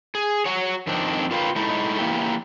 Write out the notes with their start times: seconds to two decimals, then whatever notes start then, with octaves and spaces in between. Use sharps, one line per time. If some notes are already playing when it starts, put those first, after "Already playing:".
0.15 G#4
0.45 F#4 C#5
0.87 F2 D#3 C4 D4
1.31 F4 A#4 B4 F5 G5
1.56 G#3 A3 D#4 E4
1.99 E3 F3 A#3 E4 G4